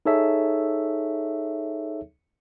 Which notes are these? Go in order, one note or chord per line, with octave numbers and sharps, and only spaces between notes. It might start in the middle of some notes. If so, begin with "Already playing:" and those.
D#4 G#4 A4 C#5 E5